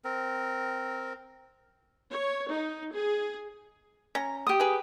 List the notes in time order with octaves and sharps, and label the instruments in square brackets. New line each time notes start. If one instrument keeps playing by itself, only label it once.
[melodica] C4 A#4
[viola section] C#5
D#4
G#4
[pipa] C#4 [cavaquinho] A#5
[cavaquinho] G4 D#6
[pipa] G#4 B4